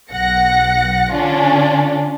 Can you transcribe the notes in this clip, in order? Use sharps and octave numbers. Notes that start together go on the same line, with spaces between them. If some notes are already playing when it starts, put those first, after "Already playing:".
B1 F#5 A#6 C#7
D3 C#4 D4 F4